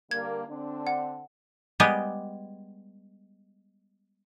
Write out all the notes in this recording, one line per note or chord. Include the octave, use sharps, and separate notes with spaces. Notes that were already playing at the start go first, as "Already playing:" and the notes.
D3 G3 A#3 G#6
D3 C4 D4
F#5
G3 G#3 B3 G4